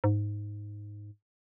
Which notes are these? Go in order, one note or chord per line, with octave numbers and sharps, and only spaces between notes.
G#2